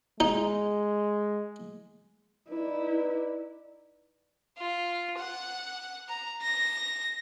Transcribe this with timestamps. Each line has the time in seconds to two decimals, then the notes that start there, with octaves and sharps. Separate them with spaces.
0.20 G#3 D#4
2.50 D#4 E4 B4 D5
4.59 F4
5.19 F#5
6.09 A#5
6.42 A#6